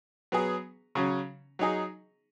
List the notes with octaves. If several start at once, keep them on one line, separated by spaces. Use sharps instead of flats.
F#3 B3 G#4
C#3 F#3 C#4
F#3 D#4 G#4